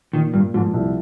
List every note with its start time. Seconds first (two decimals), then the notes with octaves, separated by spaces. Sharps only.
0.13 A#2 D#3
0.34 G2 A#2
0.54 G#2 F3
0.74 C2